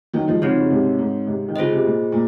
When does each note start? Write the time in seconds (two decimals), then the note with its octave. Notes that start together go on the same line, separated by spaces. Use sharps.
0.14 D#3 F#3
0.28 F3 G#3
0.41 C#3 F3 C4 D#4 F#4 C#5
0.60 C#3
0.70 G#2 C3
0.99 G#2
1.27 G#2 C3
1.48 D#3
1.56 C#3 F4 G#4 C5 D#5
1.72 C3
1.85 A#2
2.12 A#2